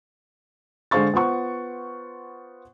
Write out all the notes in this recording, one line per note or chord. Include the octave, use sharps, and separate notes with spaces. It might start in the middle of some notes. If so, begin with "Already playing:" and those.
D3 G#3 C5 F5 C#6 A6
B3 F4 C5 F#5 C#6